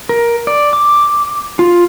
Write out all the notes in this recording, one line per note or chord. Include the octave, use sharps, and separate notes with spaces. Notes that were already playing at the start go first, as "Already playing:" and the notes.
A#4
D5
D6
F4